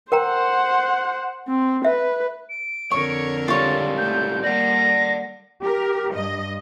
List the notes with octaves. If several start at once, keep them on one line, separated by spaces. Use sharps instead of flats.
A#4 C5 F#5 G5 A#5
C4
B4 E5
D7
F2 D3 A#4 C#5 C#6
C#2 G3 F4 C#5 A6
A3 G6
G3 A#3 D5 F#5 A#6
G4 A#4
G2 D#5